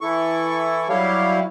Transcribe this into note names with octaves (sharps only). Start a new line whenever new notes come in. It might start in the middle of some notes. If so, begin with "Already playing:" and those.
E3 E4 A4 C#6
F#3 G3 E4 G4 C#5 F5